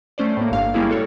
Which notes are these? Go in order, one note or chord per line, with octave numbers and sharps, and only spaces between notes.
A3 C#4 C5 D5
A2 A3 A#3
G1 G2 F5
G3 G#3 A#3 C#4 E4 G#4
F#4 A4 C#5